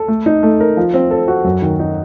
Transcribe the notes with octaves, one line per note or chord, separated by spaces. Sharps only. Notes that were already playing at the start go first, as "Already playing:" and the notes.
Already playing: A4
A3
D#4
A3
A#4
F3
C4
A4
F#4
F#2
D#3
D#4